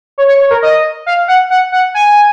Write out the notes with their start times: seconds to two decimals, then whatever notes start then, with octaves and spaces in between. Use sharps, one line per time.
0.18 C#5
0.28 C#5
0.40 C#5
0.51 A#4
0.63 D#5
1.06 F5
1.28 F#5
1.50 F#5
1.72 F#5
1.94 G#5